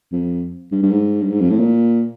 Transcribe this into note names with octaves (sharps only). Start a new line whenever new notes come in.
F2
G2
G2
G#2
G2
G#2
F2
A2
A#2